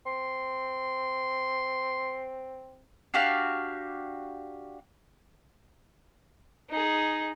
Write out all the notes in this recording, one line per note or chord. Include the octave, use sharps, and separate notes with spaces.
C4 C6
D4 F#4 G4 F5
D#4 G#4